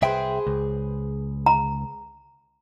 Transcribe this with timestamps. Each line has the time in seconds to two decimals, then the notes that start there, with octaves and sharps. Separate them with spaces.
0.02 C2 G#4 B4 C5 E5 G5
0.47 C#2
1.46 A#5